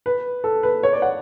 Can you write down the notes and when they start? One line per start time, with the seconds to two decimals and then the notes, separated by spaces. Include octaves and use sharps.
0.06 B4
0.44 A4
0.63 B4
0.83 C#5
0.93 D5
1.02 F#5